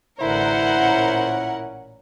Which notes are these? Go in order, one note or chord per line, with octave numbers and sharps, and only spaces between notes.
A1 D3 E4 A#4 C5 F#5
A#2 C#4